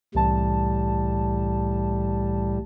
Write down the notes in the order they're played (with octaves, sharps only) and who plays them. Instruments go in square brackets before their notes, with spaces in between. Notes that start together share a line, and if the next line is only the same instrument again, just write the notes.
[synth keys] C2 E3 A5 [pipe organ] A2 G3